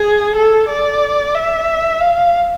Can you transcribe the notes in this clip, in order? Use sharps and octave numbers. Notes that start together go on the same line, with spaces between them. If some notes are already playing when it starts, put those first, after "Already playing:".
Already playing: G#4
A4
D5
E5
F5